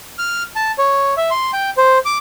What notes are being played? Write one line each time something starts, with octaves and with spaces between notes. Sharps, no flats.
F6
A5
C#5
E5
C6
G5
C5
D6